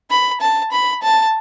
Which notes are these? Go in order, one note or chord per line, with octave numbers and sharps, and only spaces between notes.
B5
A5
B5
A5